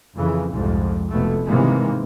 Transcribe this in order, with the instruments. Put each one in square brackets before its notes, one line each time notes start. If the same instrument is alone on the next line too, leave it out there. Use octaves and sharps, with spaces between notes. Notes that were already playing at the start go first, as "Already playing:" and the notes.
[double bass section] F2 C#3 E3
C2 F2 G#2
F1 B2 A3
G#2 C3 D#3 E3 G#3 A#3